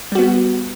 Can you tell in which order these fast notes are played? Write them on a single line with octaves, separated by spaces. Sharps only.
G3 F#4 B3